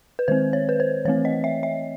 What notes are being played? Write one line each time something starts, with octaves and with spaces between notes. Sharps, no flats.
B4
D#3 G#3 C4 C5
C#5
B4
C5
E3 A3 C4 C#5
D#5
E5
E5